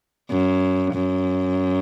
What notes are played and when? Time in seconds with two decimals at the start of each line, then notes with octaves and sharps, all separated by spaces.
0.31 F#2
0.94 F#2